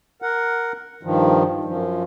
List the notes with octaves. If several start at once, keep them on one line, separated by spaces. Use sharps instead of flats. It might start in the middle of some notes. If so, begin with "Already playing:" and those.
A#4 F#5
G2 D#3 F3
F#2 F3